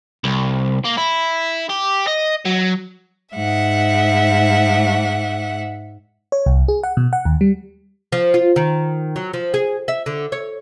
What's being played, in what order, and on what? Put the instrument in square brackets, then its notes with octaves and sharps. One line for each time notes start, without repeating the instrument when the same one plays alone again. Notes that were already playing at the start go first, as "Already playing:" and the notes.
[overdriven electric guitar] C2
A#3
E4
G4
D#5
F#3
[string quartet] G#2 E5 F#5
[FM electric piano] C#5
C2
G#4
F#5
B2
F#5
D#2
G3
[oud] F3
F4
D#3
F#3
F3
G#4
E5
D3
C#5